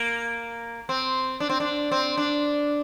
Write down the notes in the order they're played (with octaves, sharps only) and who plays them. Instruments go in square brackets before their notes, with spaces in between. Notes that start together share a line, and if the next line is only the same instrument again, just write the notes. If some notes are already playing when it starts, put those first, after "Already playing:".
Already playing: [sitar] A#3
C4
D4
C4
D4
C4
D4